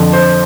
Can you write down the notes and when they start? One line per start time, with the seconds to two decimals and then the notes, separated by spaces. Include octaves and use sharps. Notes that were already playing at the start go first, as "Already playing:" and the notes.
Already playing: F2 D3
0.13 C5